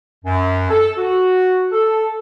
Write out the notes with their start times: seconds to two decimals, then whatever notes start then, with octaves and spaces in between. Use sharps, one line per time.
0.25 F#2
0.69 A4
0.98 F#4
1.72 A4